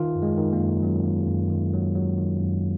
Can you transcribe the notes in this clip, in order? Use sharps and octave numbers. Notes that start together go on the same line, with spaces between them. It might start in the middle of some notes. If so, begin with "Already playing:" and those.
Already playing: D#3 F4
F#2
G#3
D#3
A#3
F#2
F#3 C#4
D#3
F#2
D#3
F#3
F#3
D#3
F#2